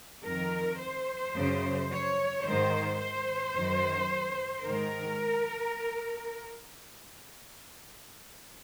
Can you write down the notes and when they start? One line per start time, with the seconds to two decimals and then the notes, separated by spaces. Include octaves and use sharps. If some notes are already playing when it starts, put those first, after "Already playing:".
0.25 F2 D#3 A#4
0.81 C5
1.35 F#2 C#3
1.90 C#5
2.45 G#2 D#3 C5
3.00 C5
3.55 F#2 D#3
4.65 G#2 D#3 A#4